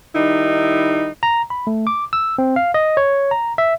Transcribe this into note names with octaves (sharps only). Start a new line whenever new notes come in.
D#3 G3 D#4 E4
A#5
B5
A3
D6
E6
C4
F5
D#5
C#5
A#5
E5